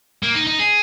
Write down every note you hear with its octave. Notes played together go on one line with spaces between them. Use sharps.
A#3
D#4
D#4
G#4